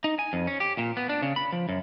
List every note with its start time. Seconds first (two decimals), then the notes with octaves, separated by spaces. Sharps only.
0.04 D#4
0.19 G#5
0.33 F2
0.47 C#4
0.60 G4
0.78 A#2
0.97 B3
1.09 D4
1.22 C#3
1.36 B5
1.52 F3
1.69 F#2